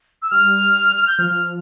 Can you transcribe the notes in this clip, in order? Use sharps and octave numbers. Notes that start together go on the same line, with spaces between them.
E6
G3 F6
G6
F3 F6